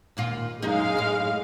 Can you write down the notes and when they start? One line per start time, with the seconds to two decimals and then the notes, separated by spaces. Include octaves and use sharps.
0.17 D#2 A#2 F4
0.62 F#2 F#3 G#3 D#4 F5
0.97 A2 D#5